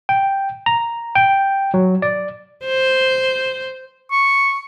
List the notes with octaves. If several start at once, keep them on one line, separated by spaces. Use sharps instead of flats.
G5
A#5
G5
F#3
D5
C5
C#6